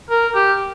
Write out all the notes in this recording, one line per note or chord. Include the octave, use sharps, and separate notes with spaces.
A#4
G4